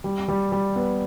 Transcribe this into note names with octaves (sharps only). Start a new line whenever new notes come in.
G3
G3
G3
B3